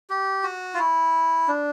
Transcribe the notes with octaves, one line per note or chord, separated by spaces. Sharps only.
G4
F#4
F4
E4
D4